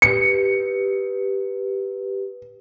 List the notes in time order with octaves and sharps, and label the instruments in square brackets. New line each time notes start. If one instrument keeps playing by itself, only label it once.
[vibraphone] G4 B4 [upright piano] C#7